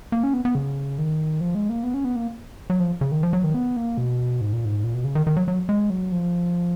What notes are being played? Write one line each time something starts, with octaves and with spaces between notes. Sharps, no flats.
A#3
C#4
B3
B3
C#3
D#3
F3
G#3
A#3
B3
C#4
B3
A#3
F#3
F3
C#3
D#3
F3
F#3
D#3
B3
A#3
B2
G#2
A#2
G#2
A#2
B2
C#3
D#3
D#3
F#3
F#3
G#3
F#3
F3